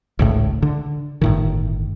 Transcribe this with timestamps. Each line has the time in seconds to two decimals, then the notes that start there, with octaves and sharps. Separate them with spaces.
0.19 G#1 C#2 A2
0.62 D3
1.21 G1 A2 D#3